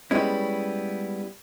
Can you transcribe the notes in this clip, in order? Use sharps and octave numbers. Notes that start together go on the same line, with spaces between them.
G3 G#3 B3 C#4 E4